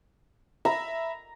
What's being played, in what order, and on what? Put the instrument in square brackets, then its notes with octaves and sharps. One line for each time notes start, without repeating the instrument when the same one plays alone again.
[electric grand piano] E5 B5 [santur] A#5